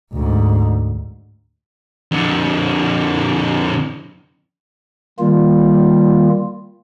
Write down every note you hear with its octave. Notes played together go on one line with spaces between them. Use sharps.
D2 G#2
F2 D3
D#3 G3 A#3 F4